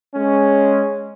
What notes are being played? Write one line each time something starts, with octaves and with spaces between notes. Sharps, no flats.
G#3 C#4